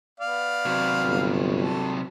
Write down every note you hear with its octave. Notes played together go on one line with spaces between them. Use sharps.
B3 D5 F5
C3 F#3
G1
A4